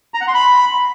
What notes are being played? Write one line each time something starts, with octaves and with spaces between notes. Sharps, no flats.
A#5
F#5
C6
B5